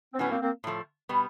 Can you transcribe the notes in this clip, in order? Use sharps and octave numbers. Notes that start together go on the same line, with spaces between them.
C4
A2 F#3 A3 B3 C#4
A#3 C4
A#3 C4
A2 F3 A3
B2 G3 B3